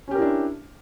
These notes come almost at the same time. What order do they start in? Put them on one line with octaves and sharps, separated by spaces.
C#4 G4 A#4 E4 D4